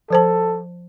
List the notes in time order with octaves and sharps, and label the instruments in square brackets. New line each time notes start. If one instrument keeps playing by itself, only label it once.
[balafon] F3 C5 A5 [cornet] A4